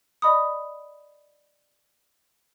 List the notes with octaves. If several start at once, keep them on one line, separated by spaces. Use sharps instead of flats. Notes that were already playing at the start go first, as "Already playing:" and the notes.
D5 D#5 B5 D#6